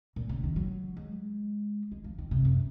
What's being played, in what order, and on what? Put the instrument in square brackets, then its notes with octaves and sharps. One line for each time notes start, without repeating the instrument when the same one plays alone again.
[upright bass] A#2
C#3
D#3
F#3
G#3
G#3
F3
D#3
C3
F#2